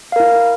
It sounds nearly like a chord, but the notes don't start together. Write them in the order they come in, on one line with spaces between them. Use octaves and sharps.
F5 A#4 E4